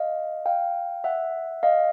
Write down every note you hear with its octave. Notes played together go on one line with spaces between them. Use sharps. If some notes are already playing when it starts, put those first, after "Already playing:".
Already playing: D#5 F5
F5 G5
E5 F#5
D#5 F5